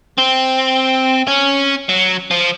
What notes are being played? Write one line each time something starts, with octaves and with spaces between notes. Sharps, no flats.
C4
C#4
F#3
F3